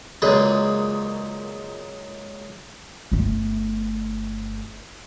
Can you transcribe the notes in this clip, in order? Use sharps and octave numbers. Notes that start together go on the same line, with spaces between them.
C#2 F#2 A#2 G#3 G#4 B4
G1 A3